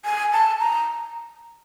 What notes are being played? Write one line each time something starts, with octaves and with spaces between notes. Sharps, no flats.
G#5
A5
A#5